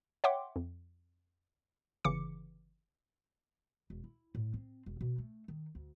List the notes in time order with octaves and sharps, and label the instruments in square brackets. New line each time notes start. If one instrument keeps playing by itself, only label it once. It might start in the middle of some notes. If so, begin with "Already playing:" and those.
[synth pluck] C#5 E5 F#5 G5 C6 D6
F2
G1 C#3 E3 D6 C#7
[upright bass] E1
E4
A2
C4
E1
B2
A3
D#3
D2